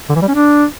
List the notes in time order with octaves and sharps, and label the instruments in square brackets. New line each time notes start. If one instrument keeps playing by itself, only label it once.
[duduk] D3
E3
G3
C#4
D4